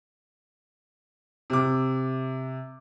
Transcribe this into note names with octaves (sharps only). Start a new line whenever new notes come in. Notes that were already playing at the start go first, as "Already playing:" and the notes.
C3 D6